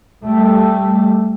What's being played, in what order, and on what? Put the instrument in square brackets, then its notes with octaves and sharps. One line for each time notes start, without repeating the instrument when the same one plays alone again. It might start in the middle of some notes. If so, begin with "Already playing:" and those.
[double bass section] G3 A3